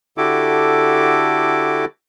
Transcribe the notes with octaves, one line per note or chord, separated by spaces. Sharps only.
D3 E4 F#4 G4 A4 D6